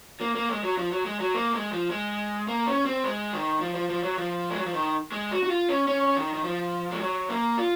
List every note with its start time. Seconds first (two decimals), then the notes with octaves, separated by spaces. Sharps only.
0.21 A#3
0.35 A#3
0.49 G#3
0.63 F#3
0.78 F3
0.91 F#3
1.06 G#3
1.20 F#3
1.34 A#3
1.53 G#3
1.72 F3
1.91 G#3
2.48 A#3
2.67 C#4
2.86 C4
3.04 G#3
3.33 D#3
3.61 F3
3.75 F3
3.89 F3
4.03 F#3
4.18 F3
4.50 G#3
4.57 F#3
4.66 F3
4.74 D#3
5.12 G#3
5.31 F#4
5.43 F#4
5.50 F4
5.69 C#4
5.87 C#4
6.16 D#3
6.34 D#3
6.44 F3
6.91 G#3
7.01 F#3
7.29 A#3
7.58 F4